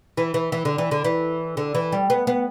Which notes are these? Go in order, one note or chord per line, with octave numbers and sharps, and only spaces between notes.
E3
E3
E3
D3
E3
D3
E3
D3
E3
G3
B3
B3